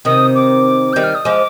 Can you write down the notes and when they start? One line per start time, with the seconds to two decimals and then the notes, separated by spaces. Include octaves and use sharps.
0.05 C3 D#3 D#6
0.35 D6
0.93 D#3 G3 G6
1.04 F6
1.15 D#6
1.25 F3 G#3 D6